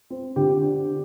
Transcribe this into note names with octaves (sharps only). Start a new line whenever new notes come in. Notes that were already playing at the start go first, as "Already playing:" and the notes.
C4
D3 G4
D4